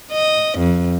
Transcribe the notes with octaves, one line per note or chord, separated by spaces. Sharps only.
D#5
F2